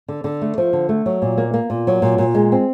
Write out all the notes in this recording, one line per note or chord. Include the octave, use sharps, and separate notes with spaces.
D3
D3
A3
F3
D3
A3
F#3
A#2
A#3
A#3
A#2
F#3
A#2
A#2
G#3
C4